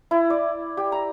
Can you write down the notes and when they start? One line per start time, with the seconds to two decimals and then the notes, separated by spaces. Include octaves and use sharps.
0.11 E4
0.30 D5
0.77 G4
0.92 A#5